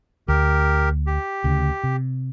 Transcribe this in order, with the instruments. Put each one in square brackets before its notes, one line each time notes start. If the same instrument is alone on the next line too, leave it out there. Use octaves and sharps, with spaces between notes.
[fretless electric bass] D2 [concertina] G4 A#4
[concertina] G4
[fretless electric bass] D2 C#3
C3